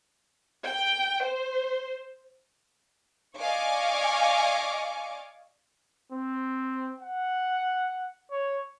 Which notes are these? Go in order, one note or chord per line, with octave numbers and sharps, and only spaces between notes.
G5
C5
D5 D#5 F5 G#5 C#6 D6
C4
F#5
C#5